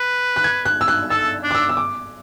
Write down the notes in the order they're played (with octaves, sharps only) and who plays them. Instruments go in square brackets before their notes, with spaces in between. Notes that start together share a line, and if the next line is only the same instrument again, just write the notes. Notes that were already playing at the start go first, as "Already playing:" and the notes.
Already playing: [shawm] B4
[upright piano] F#6
G#6
F#6
E6
F#6
[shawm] A4 [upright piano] E6
[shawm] D4
[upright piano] D6
E6
E6
D6